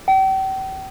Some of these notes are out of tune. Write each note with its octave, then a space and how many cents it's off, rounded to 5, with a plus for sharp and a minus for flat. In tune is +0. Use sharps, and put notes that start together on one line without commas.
G5 -40